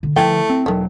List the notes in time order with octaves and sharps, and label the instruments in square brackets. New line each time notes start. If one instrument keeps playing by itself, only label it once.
[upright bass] D3
[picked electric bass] D3 F3 [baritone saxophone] A3 [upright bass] E4 [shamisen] G5 G#5
[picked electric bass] C4
[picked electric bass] E1 F#3 [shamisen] D#3 A3